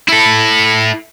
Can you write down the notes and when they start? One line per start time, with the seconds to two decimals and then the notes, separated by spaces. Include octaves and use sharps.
0.09 E4 A4